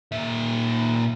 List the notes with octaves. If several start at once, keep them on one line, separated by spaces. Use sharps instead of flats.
A#2 E5